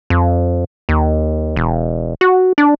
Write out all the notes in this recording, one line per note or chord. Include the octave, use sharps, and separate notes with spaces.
F2
D#2
E1
F#4
D4